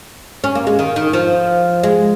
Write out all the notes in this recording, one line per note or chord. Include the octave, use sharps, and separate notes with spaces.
C#4
A#3
G#3
D#3
D#3
F3
G#3